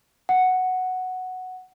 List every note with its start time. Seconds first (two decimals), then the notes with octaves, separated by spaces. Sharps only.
0.29 F#5